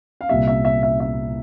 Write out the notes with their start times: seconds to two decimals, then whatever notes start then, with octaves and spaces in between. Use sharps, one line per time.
0.21 F5
0.29 C2 A#2 G3 E5
0.47 E5
0.65 E5
0.83 E5
1.00 E5